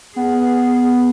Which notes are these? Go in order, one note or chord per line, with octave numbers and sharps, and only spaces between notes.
B3 G#4